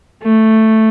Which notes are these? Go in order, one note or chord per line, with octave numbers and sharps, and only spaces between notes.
A3